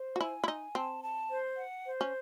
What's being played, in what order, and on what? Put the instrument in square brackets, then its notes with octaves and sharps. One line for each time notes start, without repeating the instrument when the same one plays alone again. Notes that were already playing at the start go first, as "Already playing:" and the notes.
Already playing: [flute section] C5
[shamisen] F#4
[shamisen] E4 [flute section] G#5
[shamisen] E4
[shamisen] D#4 [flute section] G#5
[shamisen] C4 [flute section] A5
[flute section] A5
C5
F#5
C5
[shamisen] C#4